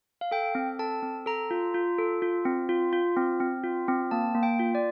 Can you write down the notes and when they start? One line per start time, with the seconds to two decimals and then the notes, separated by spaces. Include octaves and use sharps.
0.21 F5
0.31 A4 G5
0.55 C4
0.79 A4 A5
1.02 C4
1.26 A4 A#5
1.51 F4
1.74 F4
1.98 A4
2.22 F4
2.45 C4
2.69 F4
2.93 F4
3.17 C4
3.40 C4
3.64 F4
3.88 C4
4.11 A#3 A5
4.35 A#3
4.43 G5
4.59 F4
4.75 D5